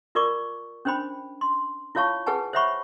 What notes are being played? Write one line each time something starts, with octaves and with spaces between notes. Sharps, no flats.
F4 A#4 D5 C#6 D6
C#4 D4 C5 G5 B5
C6
E4 F4 C#5 F5 A5 C#6
G#4 B4 F#5 G#5 A5
C5 C#5 E5 F#5 B5 C#6